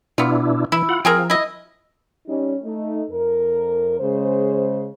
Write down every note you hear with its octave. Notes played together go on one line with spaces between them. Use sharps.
B2 B3 D4 E4 F4
E3 E4
F4 F#5
F3 C4 G#4 A#4
E4 D#5
G3 C#4 D#4
A3 D#4
F2 A#4
C#3 G#3 C5